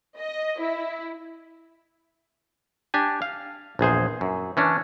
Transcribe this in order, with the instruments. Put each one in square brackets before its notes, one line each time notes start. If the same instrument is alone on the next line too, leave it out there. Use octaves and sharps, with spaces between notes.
[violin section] D#5
E4
[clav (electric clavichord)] D4 G4 G#5
F5
A#1 E2 G#4 C5
F#2
E3 C#4 D4